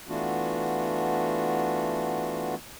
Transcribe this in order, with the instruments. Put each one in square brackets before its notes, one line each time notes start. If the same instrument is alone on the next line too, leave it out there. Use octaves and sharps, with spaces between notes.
[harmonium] E3 A3 B3 D4 F4 F#4